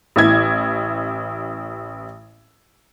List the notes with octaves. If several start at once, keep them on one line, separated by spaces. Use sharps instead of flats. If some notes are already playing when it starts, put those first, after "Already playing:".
A1 E4 G#6